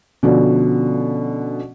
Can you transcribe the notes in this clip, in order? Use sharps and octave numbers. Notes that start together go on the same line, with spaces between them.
B2 D3 F3 C#4